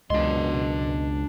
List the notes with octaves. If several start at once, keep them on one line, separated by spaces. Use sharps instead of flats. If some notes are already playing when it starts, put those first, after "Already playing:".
C#2 F#2 B2 D4 D#5 C6